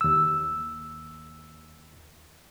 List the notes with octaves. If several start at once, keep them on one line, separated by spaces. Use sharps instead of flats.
D#2 E6